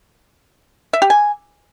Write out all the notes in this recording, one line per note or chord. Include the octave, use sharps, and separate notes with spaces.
E5
G4
G#5